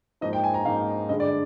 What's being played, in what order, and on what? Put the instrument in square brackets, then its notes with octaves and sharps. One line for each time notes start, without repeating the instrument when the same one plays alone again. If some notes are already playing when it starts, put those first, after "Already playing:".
[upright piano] G#2 F3 A#3 D#4 D#5
G5
G#5
A#5
G#2 F3 A#3 D#4 F5
G2 D3 G#3 D#5
D5